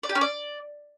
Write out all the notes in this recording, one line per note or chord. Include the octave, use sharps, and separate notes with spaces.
D5
G4
C#4
D5